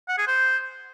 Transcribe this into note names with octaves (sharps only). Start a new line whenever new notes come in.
F#5
G#4
C5